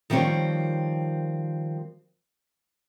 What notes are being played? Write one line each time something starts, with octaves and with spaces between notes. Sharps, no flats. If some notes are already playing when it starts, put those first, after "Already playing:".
D#3 F3 G3 C4 C#5